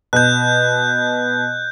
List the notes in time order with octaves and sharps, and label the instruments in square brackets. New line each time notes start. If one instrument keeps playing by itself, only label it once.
[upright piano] B2 [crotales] F#6 G6